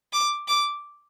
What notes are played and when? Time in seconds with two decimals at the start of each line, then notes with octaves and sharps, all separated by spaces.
0.13 D6
0.48 D6